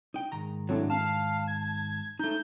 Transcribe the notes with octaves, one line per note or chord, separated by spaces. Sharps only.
D#4 G5
G#2 D#3 A#5
A2 F#3 C4 D4
F5 A5
G#6
A3 D#4 G6